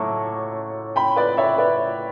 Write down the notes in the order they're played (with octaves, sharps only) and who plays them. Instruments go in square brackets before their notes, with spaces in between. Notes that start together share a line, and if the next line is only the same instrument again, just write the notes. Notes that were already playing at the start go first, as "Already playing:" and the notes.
Already playing: [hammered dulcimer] A2 F#3 A3 [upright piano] C#6 D6
[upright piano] G5 B5
B4 D5
C#5 E5
B4 D5